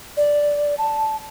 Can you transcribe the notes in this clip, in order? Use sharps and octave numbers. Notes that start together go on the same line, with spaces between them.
D5
A5